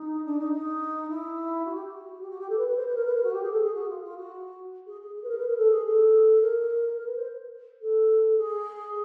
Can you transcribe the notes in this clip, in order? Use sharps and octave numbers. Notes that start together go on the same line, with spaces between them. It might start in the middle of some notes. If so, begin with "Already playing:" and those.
Already playing: D#4
D4
D#4
D#4
E4
F#4
G4
F#4
G4
F#4
G4
A4
B4
B4
C5
B4
A#4
B4
A#4
F#4
G4
G#4
A4
G#4
F#4
F4
F4
F#4
G#4
G#4
G#4
B4
A#4
B4
A#4
A4
G#4
A4
A#4
A#4
B4
C5
A4
G#4